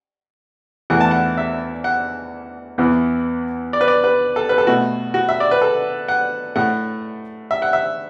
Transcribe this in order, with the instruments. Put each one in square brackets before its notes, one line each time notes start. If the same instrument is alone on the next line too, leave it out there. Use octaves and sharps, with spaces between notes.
[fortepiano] E2 E3 A3 F#5
A5
F#5
E5
F#5
E2 E3 B3
D5
B4
D5
B4
A4
B4
A4
B2 A3 F#4
F#4
E5
D5
B4
A4
F#5
A2 A3 F#5
E5
F#5
E5